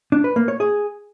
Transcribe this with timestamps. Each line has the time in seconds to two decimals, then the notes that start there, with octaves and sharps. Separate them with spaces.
0.12 D4
0.24 B4
0.36 A#3
0.48 C#5
0.60 G#4